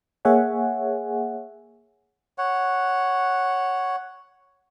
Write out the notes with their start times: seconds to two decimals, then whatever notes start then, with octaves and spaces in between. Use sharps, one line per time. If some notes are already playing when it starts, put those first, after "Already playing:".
0.25 A#3 G#4 C#5 E5 F#5 G#5
2.38 C#5 F#5